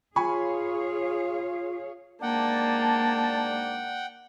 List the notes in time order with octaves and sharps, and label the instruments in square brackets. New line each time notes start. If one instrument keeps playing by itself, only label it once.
[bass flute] F4 [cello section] G#4 C#5 F5 [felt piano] G#5 B5 C#6
[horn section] G#2 D4 D5 [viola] A#3 [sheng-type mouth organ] F#5 G5 [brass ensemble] A5